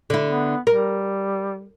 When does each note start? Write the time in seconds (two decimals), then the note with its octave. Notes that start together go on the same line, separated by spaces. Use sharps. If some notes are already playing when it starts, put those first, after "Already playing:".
0.10 D3 E4
0.27 B3
0.67 G3 A#4